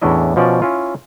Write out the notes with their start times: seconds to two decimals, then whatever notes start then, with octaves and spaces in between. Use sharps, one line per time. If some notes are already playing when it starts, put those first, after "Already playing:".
0.02 E2 A2 C#4 D4 E4 D#5
0.36 B2 F3 C#4 D5
0.62 C#4 E4 F4